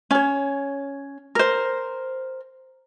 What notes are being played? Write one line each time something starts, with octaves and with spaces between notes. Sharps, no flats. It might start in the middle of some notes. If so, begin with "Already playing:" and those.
C#4 C#5
A#4 C5